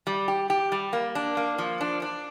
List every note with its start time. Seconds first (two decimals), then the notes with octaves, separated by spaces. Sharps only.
0.07 G3
0.28 G4
0.50 G4
0.72 G3
0.93 A#3
1.15 D4
1.37 A#3
1.58 F3
1.81 D4
2.02 D4